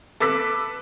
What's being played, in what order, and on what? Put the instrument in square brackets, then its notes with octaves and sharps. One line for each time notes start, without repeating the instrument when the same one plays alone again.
[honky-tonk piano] A4 B4 D6 E6 B6